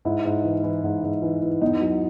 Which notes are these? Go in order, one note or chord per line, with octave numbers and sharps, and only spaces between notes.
G#2 E4
G#2
E3
E3
G#2
G#2
E3
E3
E2 D#4
F#3